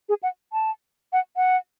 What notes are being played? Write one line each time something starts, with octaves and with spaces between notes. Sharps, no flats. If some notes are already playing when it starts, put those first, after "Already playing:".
G#4
F#5
A5
F#5
F#5